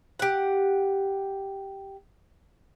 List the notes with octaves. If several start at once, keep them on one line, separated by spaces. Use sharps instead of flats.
G4 F#5